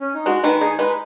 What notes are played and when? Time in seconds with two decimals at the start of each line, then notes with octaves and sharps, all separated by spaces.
0.01 C#4
0.14 D#4
0.26 G#3 F#4
0.43 D#3 B4
0.61 D#4 G#4
0.79 G#3 B4